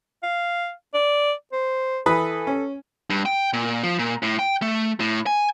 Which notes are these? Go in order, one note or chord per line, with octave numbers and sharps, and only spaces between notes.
F5
D5
C5
E3 A4 B4 D#6
C#4
G2
G5
A#2
F3
A#2
A2
G5
A3
A2
G#5